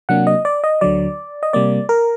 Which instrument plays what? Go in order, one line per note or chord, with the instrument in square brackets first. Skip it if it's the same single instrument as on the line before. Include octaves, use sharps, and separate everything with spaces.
[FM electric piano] C3 F#3 A#3 D4 F#5
D#5
D5
D#5
D2 D3 F#3 D5
D#5
C3 G3 A#3 D5
A#4